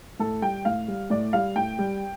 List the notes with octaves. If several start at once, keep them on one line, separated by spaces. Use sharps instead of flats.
A2 A4
G3 G5
A2 F5
G3
A2 D5
G3 F5
A2 G5
G3